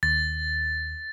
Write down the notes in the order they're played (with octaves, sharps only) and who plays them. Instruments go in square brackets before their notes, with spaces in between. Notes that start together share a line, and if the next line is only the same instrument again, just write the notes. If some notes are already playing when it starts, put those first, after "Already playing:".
[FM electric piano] D#2 [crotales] A6